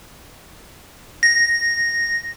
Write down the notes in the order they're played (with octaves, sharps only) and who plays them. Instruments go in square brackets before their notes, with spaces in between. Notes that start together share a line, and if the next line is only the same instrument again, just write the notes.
[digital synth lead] A#6